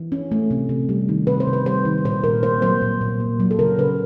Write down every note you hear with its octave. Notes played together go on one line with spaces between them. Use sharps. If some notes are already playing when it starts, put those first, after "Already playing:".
Already playing: E3
C#4
A3
C3
C3
G3
D#3
C3 B4
C5
C3
B4
G3 C5
D#3
A#2 C5
A#2 A#4
A#3 C5
F#3 C5
A#2
A#2
A#3
F#3
A4
C#3 A#4
C#3 B4